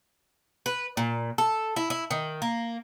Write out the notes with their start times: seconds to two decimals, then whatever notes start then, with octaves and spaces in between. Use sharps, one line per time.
0.66 B4
0.97 A#2
1.38 A4
1.76 E4
1.90 E4
2.11 D#3
2.42 A#3